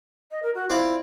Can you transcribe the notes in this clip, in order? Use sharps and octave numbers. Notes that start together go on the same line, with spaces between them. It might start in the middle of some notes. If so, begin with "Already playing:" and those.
D#5
A#4
F#4
C4 E4 F4 D5